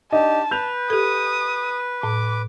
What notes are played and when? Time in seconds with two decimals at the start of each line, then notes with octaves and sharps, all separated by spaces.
0.12 D4 D#4 G4 D#5 A5
0.51 B4 G6 F7
0.90 G4 A4 D#6
2.03 A2 D6